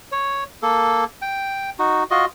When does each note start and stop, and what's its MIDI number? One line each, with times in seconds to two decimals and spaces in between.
0.12 0.44 73
0.62 1.04 58
0.62 1.04 69
1.22 1.70 79
1.79 2.04 63
1.79 2.04 66
2.11 2.25 65
2.11 2.25 66
2.11 2.25 75